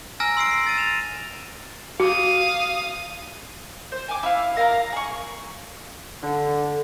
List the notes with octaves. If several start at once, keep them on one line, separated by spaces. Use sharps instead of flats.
G#5 A#5 E6 F6 A#6
C6 E6 C7 D7
C7
A6 D#7
E7 F7
F#4 F5 D#6
C5
G#5 D6
E4 F5
A#4 F5 G#5 A#5
G#4 C#6
D3